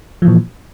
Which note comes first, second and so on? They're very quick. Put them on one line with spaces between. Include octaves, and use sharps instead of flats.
F3 E3 A#2